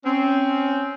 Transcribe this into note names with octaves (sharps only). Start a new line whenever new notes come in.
C4 C#4